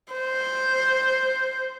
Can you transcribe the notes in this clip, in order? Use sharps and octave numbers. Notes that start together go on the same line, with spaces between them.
C5